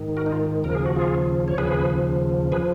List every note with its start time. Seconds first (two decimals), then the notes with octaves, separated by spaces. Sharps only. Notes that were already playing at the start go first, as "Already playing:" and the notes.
Already playing: G#2 D#3
0.17 F#4 A#4
0.26 D#4
0.32 F4
0.64 D#2 C#3 F3 A#4
0.75 G#4
0.86 F#4
0.96 F4 G#4
1.48 C#5
1.58 D#2 C#3 F3 G#4 B4
2.52 F3 G#4 B4